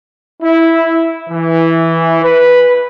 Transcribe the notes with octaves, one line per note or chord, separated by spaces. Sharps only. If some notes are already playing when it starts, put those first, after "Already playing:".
E4
E3
B4